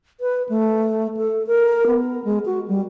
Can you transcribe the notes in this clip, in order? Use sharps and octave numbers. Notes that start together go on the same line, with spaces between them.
B4
A3
A4
A#4
B3
G#3
F#4
G3